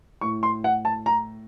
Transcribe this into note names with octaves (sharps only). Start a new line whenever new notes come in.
A2 C#6
C6
F#5
A5
A#5